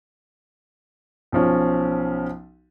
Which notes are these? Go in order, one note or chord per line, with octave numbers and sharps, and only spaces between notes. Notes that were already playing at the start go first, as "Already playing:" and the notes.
B1 F3 C#4